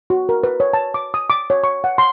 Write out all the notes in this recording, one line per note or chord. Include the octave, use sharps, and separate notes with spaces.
F#4
A#4
B4
C#5
A5
D6
D#6
D6
C#5
C#6
F#5
C6